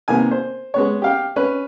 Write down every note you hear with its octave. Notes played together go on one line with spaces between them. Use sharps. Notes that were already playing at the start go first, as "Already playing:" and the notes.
C3 D#3 A#3 B3 G#5
C5
G#3 B3 C#5
G4 F5 G5
C#4 B4